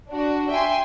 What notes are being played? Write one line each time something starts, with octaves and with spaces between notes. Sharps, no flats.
D4 F#4
E5 G5 G#5 C6